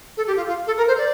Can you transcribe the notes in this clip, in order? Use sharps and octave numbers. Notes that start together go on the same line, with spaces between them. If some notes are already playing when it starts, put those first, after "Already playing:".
A4
G4
F4
F4
A4
A#4
C5
D5